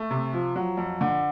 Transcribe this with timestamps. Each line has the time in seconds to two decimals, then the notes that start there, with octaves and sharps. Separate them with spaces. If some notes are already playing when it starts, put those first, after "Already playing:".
Already playing: A3
0.11 C3
0.33 F3
0.56 F#3
0.77 F2
1.01 D3